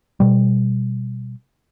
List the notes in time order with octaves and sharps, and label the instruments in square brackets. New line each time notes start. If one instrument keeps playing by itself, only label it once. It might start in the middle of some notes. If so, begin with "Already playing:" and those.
[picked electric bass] B2 G3